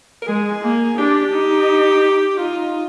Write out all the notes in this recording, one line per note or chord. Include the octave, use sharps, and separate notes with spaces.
A#4
G#3 G#4
A#3
D4 G4
D#4
D#4 F4